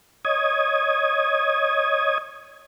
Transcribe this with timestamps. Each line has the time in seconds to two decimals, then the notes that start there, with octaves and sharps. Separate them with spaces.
0.25 C#5 D#5 D#6 G#6